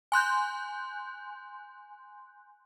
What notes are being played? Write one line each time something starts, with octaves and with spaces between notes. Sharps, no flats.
G#5 C6 F#6 G6